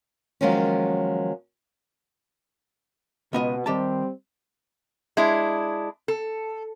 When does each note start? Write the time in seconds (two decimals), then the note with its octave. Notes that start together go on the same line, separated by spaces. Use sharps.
0.41 D#3 F3 F#3 G#3 A#3 C#4
3.33 C#2 B2 B3 D#5
3.66 D#3 G3 C4 G4 A5
5.17 G#3 D4 E4
6.08 A4